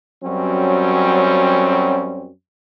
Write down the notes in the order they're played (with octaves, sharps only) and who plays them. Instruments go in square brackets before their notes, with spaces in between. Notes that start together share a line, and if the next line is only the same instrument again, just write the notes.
[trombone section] F#2 F#3 G3 C4 C#4